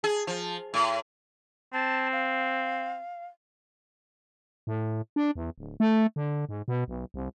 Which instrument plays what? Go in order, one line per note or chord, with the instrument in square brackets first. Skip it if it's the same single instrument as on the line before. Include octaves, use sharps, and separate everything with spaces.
[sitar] G#4
F3
A2
[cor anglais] C4 [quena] A5
[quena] F5
[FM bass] A2
D4
E2
D1
A3
D3
G#2
B2
B1
C2